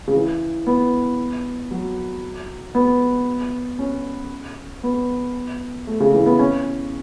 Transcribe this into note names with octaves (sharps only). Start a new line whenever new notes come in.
C#3
E3
B3
F#3
B3
C#4
B3
A3
C#3
E3
B3
C#4